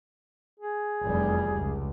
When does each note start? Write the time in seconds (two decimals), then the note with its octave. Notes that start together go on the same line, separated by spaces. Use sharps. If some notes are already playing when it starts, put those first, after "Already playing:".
0.59 G#4
1.02 F1 E2 G3
1.55 C#2